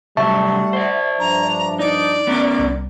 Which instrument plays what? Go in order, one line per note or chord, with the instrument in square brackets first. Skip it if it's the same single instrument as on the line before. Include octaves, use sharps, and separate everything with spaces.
[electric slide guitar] C3 F#3 [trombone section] G3 A3 [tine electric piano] E5 A5 C#6 [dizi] F#5
[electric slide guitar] C5 D5
[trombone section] G2 F3 D4 [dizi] A#5
[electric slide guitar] D#4 [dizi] D5
[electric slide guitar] B3 C#4 A#4
[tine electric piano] C2